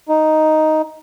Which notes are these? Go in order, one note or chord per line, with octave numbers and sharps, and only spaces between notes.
D#4